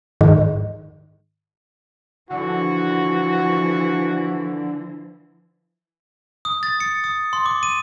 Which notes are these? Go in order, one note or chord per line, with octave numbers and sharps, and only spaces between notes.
G#2 D#3
D3 E3 F3 F#4
D#6
A6
C#7
D#6
C6
D6
D#7